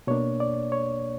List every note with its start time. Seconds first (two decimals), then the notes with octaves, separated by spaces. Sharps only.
0.07 B2 A#3 D4 C#5
0.40 D5
0.72 C#5